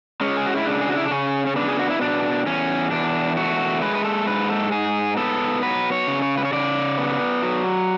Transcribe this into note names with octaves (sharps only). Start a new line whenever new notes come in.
G#3 C#4
G#4
F#4
E4
C#3 D4
G#4
F#4
E4
D4
C#3 C#4
C#4
B3 D4
G#4
F#4
E4
B2 D4
E2 C#4
E2 D4
A3 F#4
G#3 B4
B4
A4
G#2 B4
A4
G#2 G#4
B3 A4
F#3 B4
C#5
C#3
C#5
B4
C#5
C#3 D5
B3
F#3